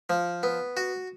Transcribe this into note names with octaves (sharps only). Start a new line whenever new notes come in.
F3
B3
F#4